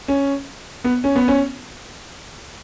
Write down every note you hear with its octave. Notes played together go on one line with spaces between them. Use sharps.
C#4
B3
C#4
B3
C#4